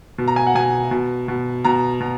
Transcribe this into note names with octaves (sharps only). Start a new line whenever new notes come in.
B2
A#5
G#5
F#5
B2 G#5
B2
B2
B2 A#5
B2